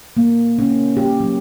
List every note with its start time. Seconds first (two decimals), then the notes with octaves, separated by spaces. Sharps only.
0.17 A#3
0.59 C#4
0.97 G4
1.20 F#3